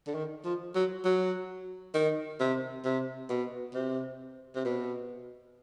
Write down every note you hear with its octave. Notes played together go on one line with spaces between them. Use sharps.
D3
D#3
F3
F#3
F#3
D#3
C3
C3
B2
C3
C3
B2